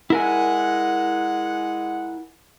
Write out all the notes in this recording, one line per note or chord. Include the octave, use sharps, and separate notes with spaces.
G#3 E4 A#4 F#5 G#5